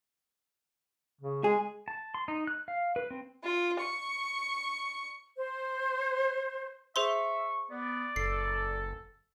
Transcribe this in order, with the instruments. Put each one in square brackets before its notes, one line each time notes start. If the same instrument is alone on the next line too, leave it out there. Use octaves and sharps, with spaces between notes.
[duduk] C#3
[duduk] G#3 [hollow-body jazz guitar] G#4
[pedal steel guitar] A5
C6
D#4
F#6
F5
B4
C4
[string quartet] F4
C#6
[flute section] C5
[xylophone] G#4 C5 C6 [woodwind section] E5 [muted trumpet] C#6
[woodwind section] B3 [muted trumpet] D5
[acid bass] F#1 [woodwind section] A4 [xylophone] C7